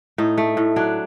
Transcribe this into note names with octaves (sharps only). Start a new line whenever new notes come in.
A2 D#4
A3
A2
F#3 D4